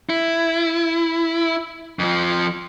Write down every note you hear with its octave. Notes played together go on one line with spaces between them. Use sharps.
E4
F2 F3